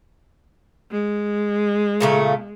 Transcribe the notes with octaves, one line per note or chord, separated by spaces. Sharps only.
G#3
A#2 C#3 A3